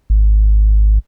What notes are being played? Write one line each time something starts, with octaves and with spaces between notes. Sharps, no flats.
G#1